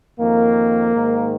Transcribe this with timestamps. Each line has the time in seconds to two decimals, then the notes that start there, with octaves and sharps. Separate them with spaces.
0.19 F2 D#3 A#3
0.94 G#2 D#3